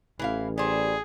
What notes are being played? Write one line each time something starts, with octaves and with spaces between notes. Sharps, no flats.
A1 E3 E4 F5
G3 G#4 C5